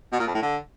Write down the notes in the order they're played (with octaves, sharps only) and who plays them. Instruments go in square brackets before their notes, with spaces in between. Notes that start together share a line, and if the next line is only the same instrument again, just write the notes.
[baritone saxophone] B2
A#2
F2
A2
D3